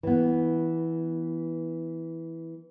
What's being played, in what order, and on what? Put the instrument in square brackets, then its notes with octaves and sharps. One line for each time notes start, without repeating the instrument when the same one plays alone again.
[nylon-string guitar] E3 B3